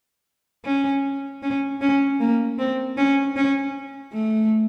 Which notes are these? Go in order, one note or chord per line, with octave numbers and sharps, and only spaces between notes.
C#4
C#4
C#4
A#3
C4
C#4
C#4
A3